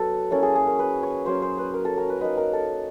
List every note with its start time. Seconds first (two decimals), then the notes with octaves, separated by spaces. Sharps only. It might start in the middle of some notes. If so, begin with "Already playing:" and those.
Already playing: F#3 B3 A4
0.31 F#3 A#3 C#4 E4 A4
0.43 G#4
0.55 G#4
0.67 A#4
0.79 B4
1.03 C#5
1.26 F#3 A#3 C#4 C5
1.42 C5
1.58 B4
1.74 A#4
1.85 A4
1.98 A#4
2.09 B4
2.21 A#3 D#4 B4
2.38 A#4
2.53 A4